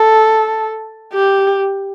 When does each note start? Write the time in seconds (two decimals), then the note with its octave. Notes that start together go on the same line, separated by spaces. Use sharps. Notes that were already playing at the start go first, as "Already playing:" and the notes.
Already playing: A4
1.14 G4